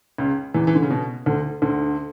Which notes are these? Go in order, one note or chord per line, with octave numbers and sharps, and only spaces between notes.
C#2 C#3
E2 E3
E3
D3
C#3
B2
D2 D3
D2 D3